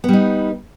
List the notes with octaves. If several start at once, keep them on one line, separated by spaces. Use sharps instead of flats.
G3 B3 D#4